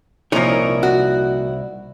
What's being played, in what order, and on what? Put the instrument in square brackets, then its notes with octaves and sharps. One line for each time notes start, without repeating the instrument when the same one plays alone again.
[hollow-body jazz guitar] C2 D#4 E4 [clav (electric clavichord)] A#2 F3 [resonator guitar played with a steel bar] A#4 C#5
[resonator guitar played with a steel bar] F#4